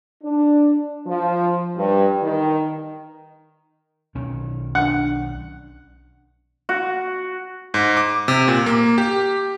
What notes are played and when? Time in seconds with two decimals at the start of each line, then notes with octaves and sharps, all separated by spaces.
0.24 D4
1.06 F3
1.76 G2
2.22 D#3
4.15 B1 D#3 C#4
4.75 D4 F#5
6.69 F#4
7.74 G#2
7.97 D6
8.28 C3
8.48 A#2
8.66 A#3
8.98 G4